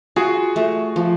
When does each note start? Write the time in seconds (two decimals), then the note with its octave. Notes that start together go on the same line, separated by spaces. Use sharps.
0.16 F4 F#4 G#4
0.56 A3
0.96 F3